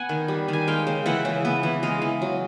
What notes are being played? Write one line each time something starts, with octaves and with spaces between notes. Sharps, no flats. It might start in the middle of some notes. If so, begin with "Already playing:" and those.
Already playing: B3 F#5 G#5
D#3
G3
D#3 G#5
G#3 F5 G5
C#3
E3 E5 F#5
C#3
B3
E3
G#3 D#5 F5
E3
F#3